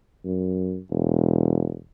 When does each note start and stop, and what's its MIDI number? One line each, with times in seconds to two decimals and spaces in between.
0.25 0.79 42
0.91 1.77 28